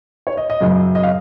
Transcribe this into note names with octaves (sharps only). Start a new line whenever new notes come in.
C#5
D#5
D#5
F#2 C#3 F#3
D#5
F5